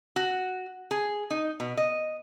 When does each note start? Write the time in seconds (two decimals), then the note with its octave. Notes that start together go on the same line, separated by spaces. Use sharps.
0.16 F#4
0.91 G#4
1.30 D#4
1.60 B2
1.77 D#5